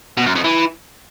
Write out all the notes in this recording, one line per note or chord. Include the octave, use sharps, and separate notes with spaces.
B2
F#2
F2
E3